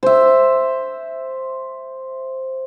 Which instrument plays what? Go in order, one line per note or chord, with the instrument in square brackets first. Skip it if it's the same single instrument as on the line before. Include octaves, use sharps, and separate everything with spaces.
[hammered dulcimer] C5 E5